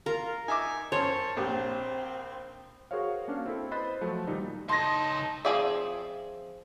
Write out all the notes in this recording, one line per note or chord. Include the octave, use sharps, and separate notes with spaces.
F4 A#4
D#4 E5 G#5 D6
F#2 C5 C#5 A5
A#1 A#2 C4 G4
F#4 G#4 A#4 C5 C#5 F5
A#3 C#4 D4 F5
C4 E4 A4
B4 C5 D#5 B5 F#6 A6
F3 F#3 A3
A#2 D#3 G3 D#4
C#2 D#4 A5 C6 A#6
F3 C4 G#4 D5 E5